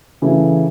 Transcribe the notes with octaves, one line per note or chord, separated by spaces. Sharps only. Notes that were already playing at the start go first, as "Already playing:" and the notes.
C#3 E3 A3 E4